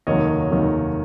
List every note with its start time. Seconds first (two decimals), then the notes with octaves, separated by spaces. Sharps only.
0.07 F1 D#2 D#3 F#3 C#5 D#5
0.50 F1 D#2 D#3 F#3